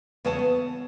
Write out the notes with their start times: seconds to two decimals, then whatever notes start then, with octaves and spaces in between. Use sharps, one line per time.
0.25 E2 C#3 B4 C#5 F#5 A5
0.39 B3